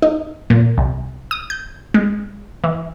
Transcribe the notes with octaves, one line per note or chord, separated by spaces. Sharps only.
D#4
A#2
C2
D#6
G6
G#3
E3